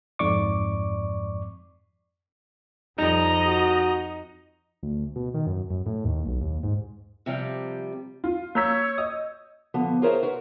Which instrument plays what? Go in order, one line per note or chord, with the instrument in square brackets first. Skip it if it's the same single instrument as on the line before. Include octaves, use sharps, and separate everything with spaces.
[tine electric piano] F2 G#2 D5 C#6 D6
[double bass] F2 [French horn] G3 [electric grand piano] D#4 [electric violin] D#5 A#5
[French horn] F#4
[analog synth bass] D2
B2
D#3
F#2
F#2
A2
D#2
B1
D#2
G#2
[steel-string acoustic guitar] C3 F3 G3
[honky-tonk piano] F4
[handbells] A#3 A#5 B6 [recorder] C#5 [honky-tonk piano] E6 G6
[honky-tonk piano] D#5 [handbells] D#6
[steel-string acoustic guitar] D3 F3 B3
F4 G#4 A#4 C5 C#5 E5
F#4 A#4 B4